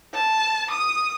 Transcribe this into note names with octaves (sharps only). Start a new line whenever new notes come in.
A5
D#6